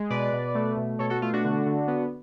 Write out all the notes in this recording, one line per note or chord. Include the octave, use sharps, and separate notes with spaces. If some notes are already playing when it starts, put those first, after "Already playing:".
Already playing: G#3
B2 B4 D5
B2
A3
B2
B2 A4 C#5
F#4 A4
A3 F4
D4 F#4
D3
D3
B3